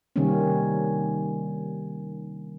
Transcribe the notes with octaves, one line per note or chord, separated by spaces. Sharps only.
C3 D#3 G3 A#3 C4 C#4